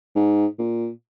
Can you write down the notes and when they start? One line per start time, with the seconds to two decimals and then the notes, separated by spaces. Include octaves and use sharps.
0.15 G#2
0.59 A#2